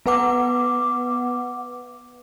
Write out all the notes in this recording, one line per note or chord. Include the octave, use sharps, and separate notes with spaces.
B3 B4 F#5 D6